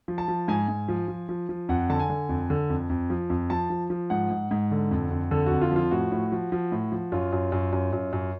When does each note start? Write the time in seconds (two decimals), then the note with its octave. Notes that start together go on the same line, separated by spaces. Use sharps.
0.08 F3
0.18 A5
0.28 F3
0.48 G#2 G#5
0.68 G#2
0.88 F3
1.08 F3
1.29 F3
1.49 F3
1.69 F2 F#5
1.90 D3 A5
1.99 G#5
2.09 D3
2.29 F2
2.50 D3
2.70 F2
2.89 F2
3.10 F3
3.30 F2
3.50 F3 A5
3.70 F3
3.90 F3
4.10 G#2 F#5
4.30 G#2
4.51 G#2
4.71 D3
4.91 F2
5.10 F2
5.31 D3 A4
5.46 F2 F#4
5.61 F4
5.71 F3 F4
5.91 A2 F#4
6.12 A2
6.32 F3
6.52 F3
6.72 A2
6.92 F3
7.12 F#2 F4
7.33 F#2
7.52 F#2
7.73 F#2
7.93 F#2
8.13 F#2